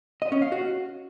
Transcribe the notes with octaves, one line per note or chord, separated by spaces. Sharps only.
D#5
C#4
F5
F#4